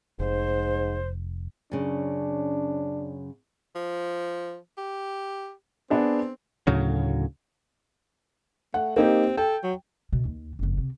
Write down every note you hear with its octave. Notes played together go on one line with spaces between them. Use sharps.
F1 G#2 C5
F#2 C#3 D4
F3
G4
B3 C4 D4 G#4
D2 A2 C#3 F#3
A3 F#5
A#3 C4 D#4 G4
A4 G5
F#3
B2 A3
D#2
F#1 F2
C3